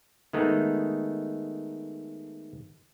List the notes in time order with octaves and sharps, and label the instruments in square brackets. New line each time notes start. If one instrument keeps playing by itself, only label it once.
[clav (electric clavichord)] D#3 G#3 A3 B3 D#4